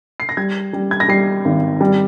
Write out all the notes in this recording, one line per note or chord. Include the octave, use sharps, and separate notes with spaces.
C7
A#6
G3 G#6
G3
G#6
A#6
G3 C7
G#1
G3